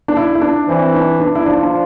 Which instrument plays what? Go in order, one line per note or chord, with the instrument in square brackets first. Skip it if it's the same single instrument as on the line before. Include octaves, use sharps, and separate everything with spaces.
[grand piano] D4
E4
E4
D4
[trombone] E3 [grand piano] C4
[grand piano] D4
D4
E4
[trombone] F3 [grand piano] D4
[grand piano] D4